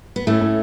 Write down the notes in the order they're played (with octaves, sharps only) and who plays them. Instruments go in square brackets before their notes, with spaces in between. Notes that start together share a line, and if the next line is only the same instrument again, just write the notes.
[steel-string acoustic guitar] B3
[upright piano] A2 [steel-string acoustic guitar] A3 C#4
[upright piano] A2